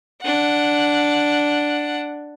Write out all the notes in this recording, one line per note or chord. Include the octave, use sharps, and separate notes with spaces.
D4 F#5